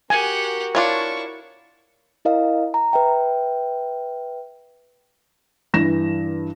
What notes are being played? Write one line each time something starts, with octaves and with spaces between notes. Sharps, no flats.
F#4 G4 A#4 F#5 G#5
D4 E4 F4 C#5 C#6
E4 A#4 D#5 F5
A#5
B4 E5 G5
G2 E3 A#6 E7